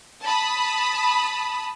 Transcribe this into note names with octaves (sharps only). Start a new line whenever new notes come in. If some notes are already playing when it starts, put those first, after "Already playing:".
A5 B5 D#6